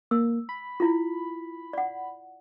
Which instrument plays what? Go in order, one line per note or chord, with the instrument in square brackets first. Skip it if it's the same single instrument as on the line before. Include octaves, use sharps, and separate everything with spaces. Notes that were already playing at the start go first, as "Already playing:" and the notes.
[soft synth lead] A#3 [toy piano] E6
[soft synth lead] B5
[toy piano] E4 F4
D5 F#5